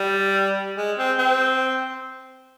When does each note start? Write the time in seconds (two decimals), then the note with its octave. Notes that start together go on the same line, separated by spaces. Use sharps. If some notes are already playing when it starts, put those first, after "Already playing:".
Already playing: G3
0.78 G#3
0.99 C4
1.19 C4